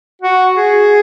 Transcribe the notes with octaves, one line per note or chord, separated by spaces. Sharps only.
F#4
G#4